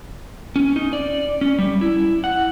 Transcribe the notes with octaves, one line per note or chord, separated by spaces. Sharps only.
C#4
D#4
D5
C#4
G3
E4
F#5